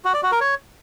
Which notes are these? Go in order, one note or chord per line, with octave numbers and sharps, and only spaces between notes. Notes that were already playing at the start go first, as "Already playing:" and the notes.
F#4
D5
F#4
A#4
C#5